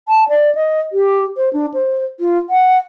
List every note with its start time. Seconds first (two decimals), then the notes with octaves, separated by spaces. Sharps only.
0.08 A5
0.28 D5
0.55 D#5
0.92 G4
1.37 C5
1.53 D4
1.74 C5
2.20 F4
2.50 F#5